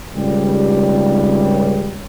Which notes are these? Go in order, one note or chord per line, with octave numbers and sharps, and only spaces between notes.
G#1 C#2 G3